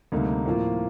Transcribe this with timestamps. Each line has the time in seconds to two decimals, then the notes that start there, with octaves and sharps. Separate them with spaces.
0.12 D2 C3 G3 A#3 D#4
0.45 A2 F3 A#3 F4